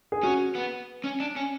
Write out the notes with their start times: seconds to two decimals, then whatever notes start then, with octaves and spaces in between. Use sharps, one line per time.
0.12 G#4
0.23 C#4 F#4
0.55 B3
1.04 C#4
1.20 D4
1.36 C#4